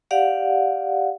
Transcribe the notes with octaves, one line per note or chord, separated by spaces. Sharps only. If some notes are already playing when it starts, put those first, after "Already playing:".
G4 D5 F5 F#5